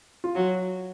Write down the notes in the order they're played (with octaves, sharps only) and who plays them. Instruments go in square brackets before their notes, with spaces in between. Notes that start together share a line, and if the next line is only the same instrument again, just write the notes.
[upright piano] F4
[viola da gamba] F#3 [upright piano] F#4